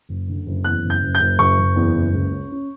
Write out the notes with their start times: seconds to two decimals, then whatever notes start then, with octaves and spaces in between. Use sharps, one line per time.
0.09 F#1
0.28 D3
0.46 F#1
0.64 E2 F#6
0.84 F#1
0.90 G6
1.02 F#1
1.15 G6
1.20 F#1
1.39 F#1 C#6
1.58 F#1
1.76 E2
1.95 F#1
2.13 C#2
2.31 C#4
2.51 C#4